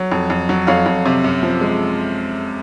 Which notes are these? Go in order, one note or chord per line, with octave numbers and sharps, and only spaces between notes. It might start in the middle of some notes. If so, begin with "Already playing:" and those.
Already playing: F#3 C#5
F2
F2
F#3
F2 C#5 F5
F2
C3
F#2
F3
G#3